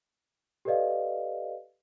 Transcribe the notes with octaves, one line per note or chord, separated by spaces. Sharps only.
G4 A4 B4 D5 D#5 F5